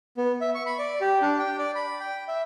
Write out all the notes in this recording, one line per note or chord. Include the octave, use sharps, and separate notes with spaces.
B3
E5
C#6
B5
D5
G4
D4
G5
D5
B5
G5
E5